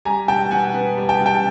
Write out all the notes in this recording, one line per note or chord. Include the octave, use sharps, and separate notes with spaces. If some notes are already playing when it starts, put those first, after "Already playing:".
G3 G#5 A#5
B2 G5 A5
B2 F#5 G#5
B3
G3
G5 A5
B2
G5 A5